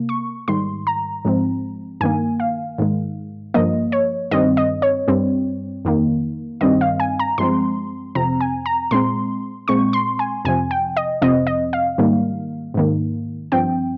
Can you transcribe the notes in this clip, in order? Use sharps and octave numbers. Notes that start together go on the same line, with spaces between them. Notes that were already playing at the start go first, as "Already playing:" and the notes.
Already playing: C3 A#3
C#6
G#2 D#3 G3 C6
A#5
G#2 F3 G#3 C4
G2 D#3 A#3 G#5
F5
G#2 D#3 G#3
G2 F3 A#3 D#5
C#5
G2 D#3 G3 C4 D#5
D#5
C#5
G2 G3 C4
F2 D#3 A#3
G2 D#3 G3 C4 D#5
F5
G#5
A#5
G2 F3 G#3 C4 C6
F2 C3 F3 C4 A#5
G#5
A#5
A#2 G#3 C4 C6
A#2 G#3 C4 C#6
C6
G#5
F2 C3 F3 G#5
G5
D#5
F2 C3 F3 C4 D#5
D#5
F5
G#2 D#3 G3 A#3
G#2 D#3 A#3
G2 F3 C4 G5